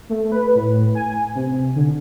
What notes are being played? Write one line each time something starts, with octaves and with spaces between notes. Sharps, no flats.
A3
B4
A2
G#5
C3
D3